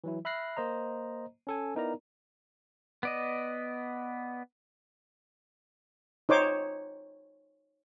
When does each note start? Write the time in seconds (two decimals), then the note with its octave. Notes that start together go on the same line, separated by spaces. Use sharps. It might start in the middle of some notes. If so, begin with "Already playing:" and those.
0.04 E3 F#3 E4
0.25 E5 B5 F6 F#6 A#6 C7
0.57 A#3 C5 D#5 A#5
1.47 C#4 A4 G#5
1.75 B3 D#4 E4 A#4 D5 A#5
3.03 B3 D5 D#5
6.29 D#4 C5 C#5 D6